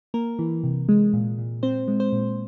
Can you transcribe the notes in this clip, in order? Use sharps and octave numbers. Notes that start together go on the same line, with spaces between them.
A#3 A#4
E3
C3
G#3
A#2
A#2
C4 C5
G#3
C5
A#2